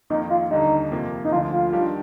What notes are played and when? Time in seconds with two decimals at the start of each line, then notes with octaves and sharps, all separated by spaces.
0.10 F2 D#3 A#3 D#4
0.30 F4
0.51 D#2 D3 G3 D#4
0.92 F2 C3 F3 A#3
1.25 D#4
1.32 D2 D3 F3 F4
1.53 F4
1.73 D#3 G3 D4 G4